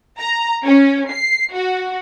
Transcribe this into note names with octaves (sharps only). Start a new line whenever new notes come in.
A#5
C#4
C7
F#4